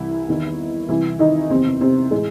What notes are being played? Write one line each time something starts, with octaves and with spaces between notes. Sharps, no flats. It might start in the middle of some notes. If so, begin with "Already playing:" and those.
Already playing: C2 C3 E3 E4
E2 D#3
C2 C3 E3 E4
D#3 D#4
F#1 E2 C3 D#3 C4
C3 C4
A2 E3 G#3